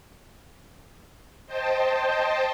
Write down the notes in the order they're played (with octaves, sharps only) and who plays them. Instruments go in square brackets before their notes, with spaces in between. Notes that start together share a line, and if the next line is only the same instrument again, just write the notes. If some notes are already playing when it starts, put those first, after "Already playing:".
[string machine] C5 D#5 G5 A5